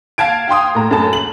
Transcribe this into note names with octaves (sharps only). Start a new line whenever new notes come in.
F5 A5 G#6 D7
F5 G5 C6 D#6
A2 A#5
F#2 A3 A5
F#7